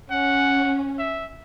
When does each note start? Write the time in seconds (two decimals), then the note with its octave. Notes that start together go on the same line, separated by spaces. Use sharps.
0.11 C#4 F#5
0.99 E5